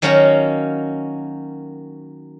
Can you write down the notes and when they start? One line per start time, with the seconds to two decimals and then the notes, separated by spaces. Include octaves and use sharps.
0.02 D#3 F#3 A#3 C#4 F5 A#5